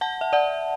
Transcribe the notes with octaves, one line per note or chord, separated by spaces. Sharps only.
F#5 A5
E5
D5 F#5